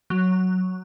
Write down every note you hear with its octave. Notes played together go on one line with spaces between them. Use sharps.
F#3